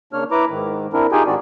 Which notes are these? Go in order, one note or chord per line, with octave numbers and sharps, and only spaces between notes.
C#3 A#3 D4 C#5 F6
E4 B4 A#5 D6
G#2 D#3
C4 D4 E4 A#4
D#4 F4 G4 G#4 G5 G#5
G#2 D#3 C4 F#4 D5